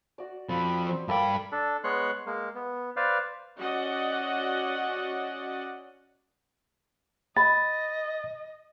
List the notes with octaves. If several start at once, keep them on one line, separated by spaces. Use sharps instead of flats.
F#4 D5
F3 C4 B5
C5
G2 A#3 A4 D5 G5 B5
D4 A4
G#3 B3 C#5 C6 F#6
G#3 A#3
B3
B4 C5 D5 F5
C#4 F#4 D5 D#5 F#5
D#5 B5 A6